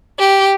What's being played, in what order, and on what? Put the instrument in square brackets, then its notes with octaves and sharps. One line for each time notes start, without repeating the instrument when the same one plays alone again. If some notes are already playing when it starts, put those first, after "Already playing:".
[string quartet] G4